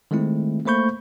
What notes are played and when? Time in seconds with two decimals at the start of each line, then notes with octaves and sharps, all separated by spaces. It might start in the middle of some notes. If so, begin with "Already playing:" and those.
0.11 D#3 G#3 A3 C4 E4
0.66 A3 A#3 C5 B5 C#6 G6